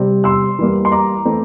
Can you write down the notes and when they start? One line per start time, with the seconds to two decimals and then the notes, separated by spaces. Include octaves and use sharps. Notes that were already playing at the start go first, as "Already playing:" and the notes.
Already playing: C3 G3 C4
0.24 C6 E6
0.59 E3 G3 A#3
0.85 C6
0.92 A#5 D6
1.25 E3 A3 C4